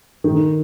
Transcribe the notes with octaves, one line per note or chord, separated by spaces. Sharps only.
D#3